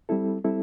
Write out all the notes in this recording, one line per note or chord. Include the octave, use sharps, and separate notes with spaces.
G3 C4 E4 A4
G3 C4 E4 A4